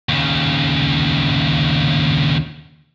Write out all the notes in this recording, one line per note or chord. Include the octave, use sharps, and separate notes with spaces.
D#2 C#3